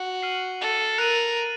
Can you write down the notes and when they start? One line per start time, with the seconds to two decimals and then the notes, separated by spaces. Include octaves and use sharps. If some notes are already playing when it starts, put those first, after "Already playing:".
Already playing: F#4
0.22 F6 C7 D#7 F#7
0.61 A4
0.98 A#4 F#6 A6 D#7 F#7